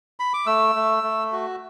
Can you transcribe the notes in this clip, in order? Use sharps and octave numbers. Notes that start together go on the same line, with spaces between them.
B5
D6
A3 E6
A3
A3
F#4